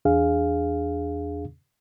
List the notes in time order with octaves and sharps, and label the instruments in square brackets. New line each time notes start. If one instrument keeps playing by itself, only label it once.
[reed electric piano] E2 D4 G#4 F5